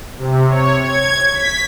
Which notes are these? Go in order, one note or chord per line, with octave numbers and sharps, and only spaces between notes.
C3
C#5
G#6
B6